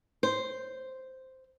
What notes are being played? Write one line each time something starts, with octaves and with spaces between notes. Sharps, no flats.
C5